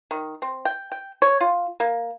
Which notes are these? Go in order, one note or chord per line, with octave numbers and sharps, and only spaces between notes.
D#3
C4
G5
G5
C#5
F4
A#3